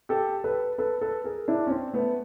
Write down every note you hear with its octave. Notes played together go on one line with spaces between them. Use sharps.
G4 A4
A4 B4
A4 B4
A4 B4
G#4 A#4
D4 E4
C#4
C4 D4
A3 B3